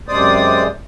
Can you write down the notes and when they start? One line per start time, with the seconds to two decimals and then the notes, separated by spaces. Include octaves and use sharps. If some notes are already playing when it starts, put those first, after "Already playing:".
0.08 F#2 C3 G#3 C5 D5 D#6